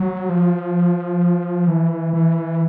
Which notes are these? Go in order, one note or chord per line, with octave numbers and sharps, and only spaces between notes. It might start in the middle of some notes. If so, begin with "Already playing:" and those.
Already playing: F#3
F3
E3
E3